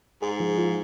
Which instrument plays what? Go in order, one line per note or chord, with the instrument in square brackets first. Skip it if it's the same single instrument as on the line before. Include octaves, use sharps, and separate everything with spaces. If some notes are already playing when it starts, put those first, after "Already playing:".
[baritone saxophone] G#2 [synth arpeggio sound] G#4
[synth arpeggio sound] F3
F4